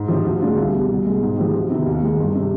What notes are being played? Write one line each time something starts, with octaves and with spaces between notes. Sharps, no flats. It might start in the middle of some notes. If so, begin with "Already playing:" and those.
Already playing: G#2
F3 C4 G4
D2
D3 G#3 D4 F4
C2
B2 G3
C2
B2 G#3
G#2
F3 G#3 C4 G4
D2
C3 D#3 B3
D#2
D#3 G#3
G1
C3